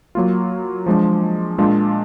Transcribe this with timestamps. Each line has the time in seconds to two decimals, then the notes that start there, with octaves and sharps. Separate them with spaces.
0.15 F#3 A#3 F4
0.86 F3 G#3 D4
1.58 A#2 G#3 D4 F4